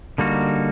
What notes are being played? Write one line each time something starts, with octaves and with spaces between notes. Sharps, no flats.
D3 G3 A#3 D#4 F#4